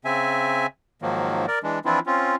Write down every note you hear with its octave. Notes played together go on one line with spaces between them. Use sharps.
C#3 C4 E5 G#5
G#2 D#3 F3 F#3 A#3
A#4 D5
E3 G#3 D4
E3 F3 C4 D4 E4 F4
C4 C#4 F4